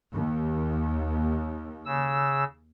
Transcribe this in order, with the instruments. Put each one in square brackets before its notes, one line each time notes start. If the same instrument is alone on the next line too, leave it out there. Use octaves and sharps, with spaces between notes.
[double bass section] D#2
[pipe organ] C#3 E6